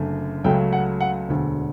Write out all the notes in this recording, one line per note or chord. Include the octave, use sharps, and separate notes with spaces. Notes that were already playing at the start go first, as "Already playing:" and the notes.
Already playing: F#1 F#2 D3 A3
C#2 C#3 F#3 A3 G5
F#5
F#5
E1 D2 D3